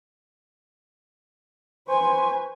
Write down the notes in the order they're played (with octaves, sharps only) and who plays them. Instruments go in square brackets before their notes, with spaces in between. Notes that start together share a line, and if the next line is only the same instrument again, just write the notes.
[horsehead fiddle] B4 G#5 [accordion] C5 C#6